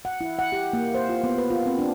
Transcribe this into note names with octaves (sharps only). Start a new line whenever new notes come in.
F#5
E4
F#5
G4
A#3
C5
F4
B3
B4
F4
C4
D4